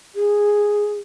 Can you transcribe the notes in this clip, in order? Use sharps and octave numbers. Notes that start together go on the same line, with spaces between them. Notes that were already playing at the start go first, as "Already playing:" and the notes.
G#4